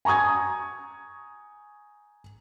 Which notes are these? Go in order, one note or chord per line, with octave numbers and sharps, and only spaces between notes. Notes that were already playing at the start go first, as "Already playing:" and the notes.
G#5 A#5 C#6 D#6 G#6